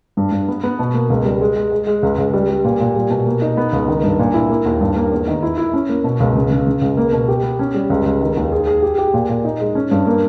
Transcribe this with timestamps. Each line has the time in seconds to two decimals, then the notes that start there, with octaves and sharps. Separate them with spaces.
0.17 G2
0.32 G2
0.48 B3
0.63 B3
0.79 B2
0.94 A#3
1.10 C#2
1.25 G3
1.41 G#3
1.56 G#3
1.72 G#3
1.87 G#3
2.03 C#2
2.18 C#2
2.34 G3
2.49 G3
2.64 A#2
2.80 A#2
2.95 G3
3.10 B2
3.26 A#3
3.42 D#4
3.57 B3
3.73 C#2
3.88 D#3
4.03 G2
4.19 A#2
4.34 E4
4.50 A#3
4.66 D#2
4.80 G2
4.96 A#3
5.11 E2
5.27 D#3
5.43 E4
5.57 E4
5.74 C#4
5.89 A#3
6.04 B2
6.20 C#2
6.36 C#3
6.51 C#3
6.67 C#3
6.82 C#2
6.97 A#3
7.13 B2
7.28 G4
7.43 B3
7.59 C#4
7.74 G3
7.90 C#2
8.06 C#2
8.21 D#3
8.37 D#2
8.52 G#4
8.67 G#4
8.82 G4
8.98 G4
9.14 A#2
9.29 A#2
9.45 D#4
9.60 G#3
9.75 C#4
9.91 G2
10.07 A#3